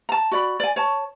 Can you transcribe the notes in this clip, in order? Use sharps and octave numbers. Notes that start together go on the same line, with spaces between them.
A5 A#5
F#4 D5 B5
D5 G#5
C#5 A5